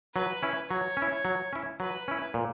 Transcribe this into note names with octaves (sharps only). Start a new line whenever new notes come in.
F#3 B4
C#4 E4
F#3 C#5
C#4
E4
F#3
C#4 E4
F#3 B4
C#4 E4
A#2